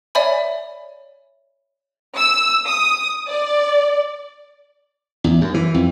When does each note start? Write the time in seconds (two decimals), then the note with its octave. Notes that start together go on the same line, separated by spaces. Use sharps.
0.15 C#5 D5 E5 G#5 B5
2.16 E6
2.65 D#6
3.28 D5
5.24 E2
5.41 F#2
5.54 E3
5.74 F2